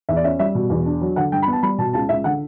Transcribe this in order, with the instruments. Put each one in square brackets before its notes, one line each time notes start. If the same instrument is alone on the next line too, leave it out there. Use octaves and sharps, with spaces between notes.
[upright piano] E2 E5
D5
C#4 E5
G3 E5
B2
E2
D4
F#3
D3 F#5
G2 G5
B5
B3 A5
G3 B5
B2 A5
C#2 A5
C#2 E5
D3 F#5